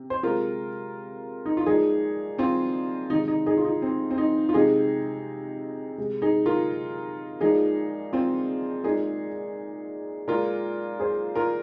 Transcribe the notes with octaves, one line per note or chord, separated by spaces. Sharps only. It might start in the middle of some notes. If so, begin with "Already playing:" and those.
Already playing: C3
C5
C3 G#3 F4 A#4
D#4
F4
A#2 F3 G#3 D#4 G#4
C4 F4
C3 D#3 G#3 D#4
D#4
D#4 G#4
F4
D#4
C4
C4
D#4
F4
C3 F3 G#3 D#4 G#4
C3 G#3
D#4 G#4
F4 A#4
A#2 F3 G#3 D#4 G#4
C4 F4
A#2 G#3 D#4 G#4
A#2 G#3 F4 A#4
G#4 C5
F4 A#4